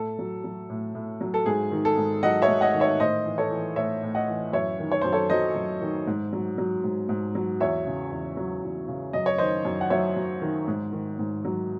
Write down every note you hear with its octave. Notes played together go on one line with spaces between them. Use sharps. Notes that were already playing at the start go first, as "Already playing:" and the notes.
Already playing: A2 A4
F#3
F#3
A2
A2
F#3
A4
G#2 G#4
D#3
A4
G#2
F#3 D#5 F#5
C#5 E5
G#2
D#5 F#5
D#3
C#5 E5
A2 C5 D#5
E3
A4 C#5
E3
A2 C#5 E5
A2
D#5 F#5
E3
F#2 C#5 E5
D#3
C#5
F#2 C5
A4 C#5
F#3 C5 D#5
F#2
D#3
G#2
F#3
F#3
G#2
G#2
F#3
E2 C#5 E5
C#3
E2
F#3
E2
C#3
F#2 D#5
C#5
D#3 C5 D#5
F#2
F#5
F#3 C#5 E5
F#2
D#3
G#2
D#3
G#2
F#3